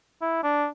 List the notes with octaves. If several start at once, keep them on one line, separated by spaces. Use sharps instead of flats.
E4
D4